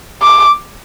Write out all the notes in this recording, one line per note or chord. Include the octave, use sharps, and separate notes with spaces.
D6